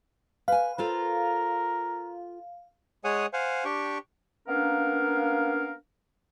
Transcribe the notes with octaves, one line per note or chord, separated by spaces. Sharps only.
B4 F5 G#5
F4 A4 A#4 C5
G#3 G#4 C#5 F#5 G#5 D#6
C5 F5 F#5 G#5
D4 G4 G5 C#6
A#3 B3 C#4 D4 A#4 F5